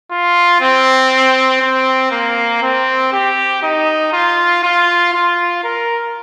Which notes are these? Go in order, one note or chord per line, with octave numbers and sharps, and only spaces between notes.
F4
C4
C4
A#3
C4
G4
D#4
F4
F4
F4
A#4